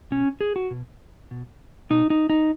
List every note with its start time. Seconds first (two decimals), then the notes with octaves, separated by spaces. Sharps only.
0.11 B2 C#4
0.41 G#4
0.56 F#4
0.71 B2
1.31 B2
1.90 B2 D#4
2.10 D#4
2.30 D#4